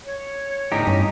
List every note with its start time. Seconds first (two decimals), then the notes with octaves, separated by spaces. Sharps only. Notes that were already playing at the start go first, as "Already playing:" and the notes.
0.05 C#5
0.72 E2 A2 D3 D#4 G4
0.87 G2 C#4